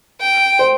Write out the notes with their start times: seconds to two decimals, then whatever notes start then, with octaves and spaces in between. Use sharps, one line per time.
0.20 G5
0.59 C5